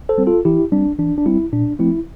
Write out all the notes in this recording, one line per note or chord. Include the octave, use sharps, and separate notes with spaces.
A4 C5
G3 C4
F4 A4
E3 E4 G4
G3 C4 D4
E3 D4
D4
G3 C4 E4
A#2 D4
F3 A3 C4 E4